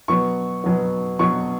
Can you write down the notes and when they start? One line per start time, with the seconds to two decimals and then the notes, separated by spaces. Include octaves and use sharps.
0.08 B2 F#3 B3 C#6
0.64 B2 F#3 B3
1.19 B2 F#3 B3 C#6